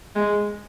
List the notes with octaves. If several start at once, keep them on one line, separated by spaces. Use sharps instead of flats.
G#3